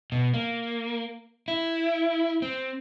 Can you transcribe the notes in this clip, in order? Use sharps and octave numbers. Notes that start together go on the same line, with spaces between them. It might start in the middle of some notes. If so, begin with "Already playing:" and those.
B2
A#3
E4
C4